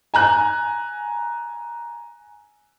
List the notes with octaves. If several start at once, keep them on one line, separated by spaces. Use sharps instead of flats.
G#5 A#5 F#6